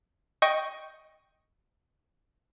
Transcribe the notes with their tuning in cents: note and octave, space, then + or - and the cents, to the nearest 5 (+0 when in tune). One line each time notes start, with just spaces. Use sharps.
D#5 +10 G5 +0 C#6 +0